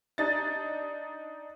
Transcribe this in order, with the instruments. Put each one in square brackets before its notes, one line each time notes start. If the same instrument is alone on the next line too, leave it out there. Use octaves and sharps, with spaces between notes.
[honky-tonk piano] D4 D#4 A6